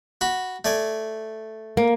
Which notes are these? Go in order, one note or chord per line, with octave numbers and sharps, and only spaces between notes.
F#4 B5
A3 D5 G#5
A#3